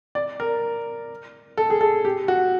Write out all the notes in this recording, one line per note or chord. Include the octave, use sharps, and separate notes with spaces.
D5
A#4
A4
G#4
A4
G4
F#4